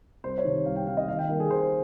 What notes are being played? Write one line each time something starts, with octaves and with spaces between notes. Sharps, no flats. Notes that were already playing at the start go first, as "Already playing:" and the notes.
C2 C5
C#5
C3 D#3
C2 F5
G5
C3 D#3 F5
D#5
D#2 F5
G5
D#3 G3 A#3 A#4
G#4
D#2 C5